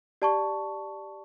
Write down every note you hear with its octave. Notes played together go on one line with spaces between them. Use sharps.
G4 D5 A5 C#6